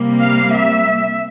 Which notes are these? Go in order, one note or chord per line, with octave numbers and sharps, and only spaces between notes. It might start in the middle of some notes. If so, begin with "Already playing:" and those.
Already playing: C3 G3 A#3
F5
E5